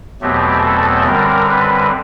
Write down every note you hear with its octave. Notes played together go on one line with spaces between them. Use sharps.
E2 B2 F#3 A3 C4 G4
A4
F#2 D3 G3 C4 A#4
B4